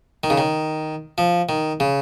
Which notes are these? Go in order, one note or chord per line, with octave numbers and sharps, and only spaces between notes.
D#3
C#3
D#3
F3
D#3
C#3